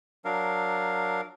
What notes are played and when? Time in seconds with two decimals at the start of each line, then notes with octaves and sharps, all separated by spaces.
0.25 F#3 D4 A#4 F5